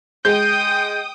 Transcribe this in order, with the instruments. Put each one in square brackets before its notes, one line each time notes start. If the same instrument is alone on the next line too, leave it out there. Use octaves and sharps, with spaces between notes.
[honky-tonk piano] G#3 [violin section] G5 D#6 [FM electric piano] G6